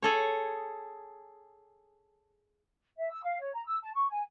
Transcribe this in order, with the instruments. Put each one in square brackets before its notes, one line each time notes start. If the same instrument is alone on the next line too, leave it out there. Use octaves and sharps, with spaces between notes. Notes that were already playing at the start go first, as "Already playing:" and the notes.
[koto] G#4 A4 C#5
[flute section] E5
E6
F5
C#5
A#5
E6
A5
C#6
G#5